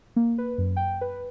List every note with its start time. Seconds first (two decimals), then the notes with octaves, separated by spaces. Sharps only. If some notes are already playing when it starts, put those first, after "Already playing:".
0.16 A#3
0.38 B4
0.58 F#2
0.76 G5
1.01 B4